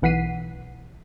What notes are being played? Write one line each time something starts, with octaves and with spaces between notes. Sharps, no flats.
B1 E3 F#5 B6 C7 D#7